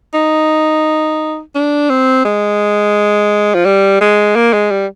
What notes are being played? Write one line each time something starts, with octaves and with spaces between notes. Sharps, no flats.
D#4
D4
C4
G#3
F3
G3
G#3
A#3
G#3
G3